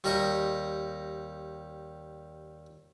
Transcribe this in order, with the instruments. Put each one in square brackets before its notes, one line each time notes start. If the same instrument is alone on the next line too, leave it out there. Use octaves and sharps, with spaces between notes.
[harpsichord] D#2 G3 A#4 D#5 A#5 C#6